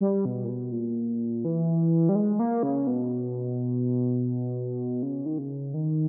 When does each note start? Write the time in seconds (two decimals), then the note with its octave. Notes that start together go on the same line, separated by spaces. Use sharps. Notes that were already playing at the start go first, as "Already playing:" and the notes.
0.01 G3
0.25 B2
0.44 A#2
0.49 B2
0.72 A#2
1.45 E3
2.09 G3
2.15 G#3
2.39 A#3
2.63 C#3
2.87 B2
5.03 C#3
5.26 D#3
5.38 C#3
5.74 D#3